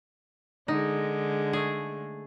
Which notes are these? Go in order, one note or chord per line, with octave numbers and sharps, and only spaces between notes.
D3 G#3 D#4
A3 G#4